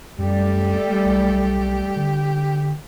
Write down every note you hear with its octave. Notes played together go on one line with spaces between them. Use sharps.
F#2 G3 A3 G4 A4
B1
D3